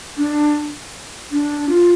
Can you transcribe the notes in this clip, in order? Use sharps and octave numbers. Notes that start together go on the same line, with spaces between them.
D4
D4
F4